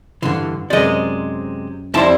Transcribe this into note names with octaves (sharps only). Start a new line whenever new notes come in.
G2 D3 E3 C6
F#2 C3 G#3 C5 D5 D#5
F2 G3 C4 E4 C5 A5